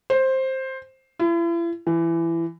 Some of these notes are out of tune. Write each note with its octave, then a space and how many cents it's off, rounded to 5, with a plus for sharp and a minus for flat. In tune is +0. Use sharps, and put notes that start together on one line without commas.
C5 +10
E4 +40
E3 +20